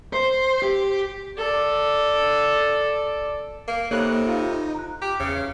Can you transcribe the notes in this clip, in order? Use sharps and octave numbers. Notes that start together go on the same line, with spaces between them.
C5
G4
A4 D5
A#3
C3 A#3 D#4 A4 C#5 B5 F#6
F4
A#5 F#6
G4
E2 C#3